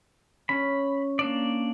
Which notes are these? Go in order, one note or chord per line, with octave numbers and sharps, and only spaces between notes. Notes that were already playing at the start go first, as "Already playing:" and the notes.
C#4 B5
A#3 D4 D5